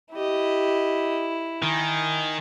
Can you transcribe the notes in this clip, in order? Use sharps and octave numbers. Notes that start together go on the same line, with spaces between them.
E4 G4 D#5
D#3 G#5